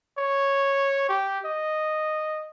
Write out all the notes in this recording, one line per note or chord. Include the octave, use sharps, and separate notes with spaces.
C#5
G4
D#5